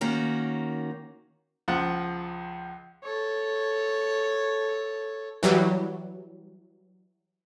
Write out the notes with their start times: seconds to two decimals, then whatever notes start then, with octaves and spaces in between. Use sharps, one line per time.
0.01 D#3 A#3 C#4 F#4
1.68 C#2 F3 F#5
3.04 A4 C#5
5.43 E3 F#3 G3